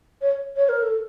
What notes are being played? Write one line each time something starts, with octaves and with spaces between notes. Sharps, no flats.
C#5
C#5
A#4
A4